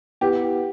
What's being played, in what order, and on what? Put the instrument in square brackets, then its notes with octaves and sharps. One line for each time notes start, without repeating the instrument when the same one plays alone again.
[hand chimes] B3 E4 B4 F#5 [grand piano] G4